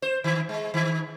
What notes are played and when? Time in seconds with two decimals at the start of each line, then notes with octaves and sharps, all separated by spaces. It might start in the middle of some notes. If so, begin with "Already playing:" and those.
0.02 C5
0.24 D#3
0.49 G#3
0.74 D#3